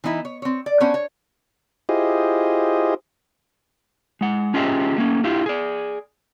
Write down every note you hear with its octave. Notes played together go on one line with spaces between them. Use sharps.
E3 B3 D#4 E4
C#5
C4 C#5
D5
B3 C#4 D4 C5 C#5
C#5
E4 F4 G4 G#4 C5 D#5
G#3 F#5
C#4 F4 G4 G#4 D#5 E5
A3 A#3 C#4
D4 E4 F4 G4
G#4 D5